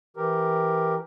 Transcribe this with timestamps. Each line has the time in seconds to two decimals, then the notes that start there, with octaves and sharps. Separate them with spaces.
0.17 E3 G4 A#4